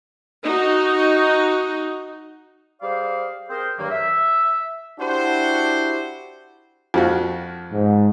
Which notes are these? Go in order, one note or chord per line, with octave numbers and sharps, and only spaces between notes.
D#4 F#4
G3 G#4 C5 D5 F5
C4 G#4 A#4 C5
G2 D#3 F#3 A#3
E5
D4 E4 F#4 G4 C5
F2 F3 F#4
G#2